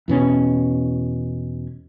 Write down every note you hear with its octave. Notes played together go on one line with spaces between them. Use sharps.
E2 B2 C#4